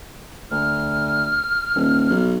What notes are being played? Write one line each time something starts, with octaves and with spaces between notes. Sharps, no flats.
D2 F6
D#1
B1